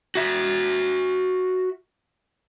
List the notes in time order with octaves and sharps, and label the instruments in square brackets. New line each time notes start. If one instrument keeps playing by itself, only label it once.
[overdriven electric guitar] F#4 E5